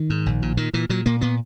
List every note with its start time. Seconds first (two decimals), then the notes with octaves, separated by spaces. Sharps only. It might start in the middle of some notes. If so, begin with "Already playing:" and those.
Already playing: D#3
0.10 G#2
0.26 A#1
0.42 A#2
0.57 A#2 D#3
0.74 A#2 E3
0.90 A#2 F#3
1.06 A#2 A#3
1.21 A#2 B3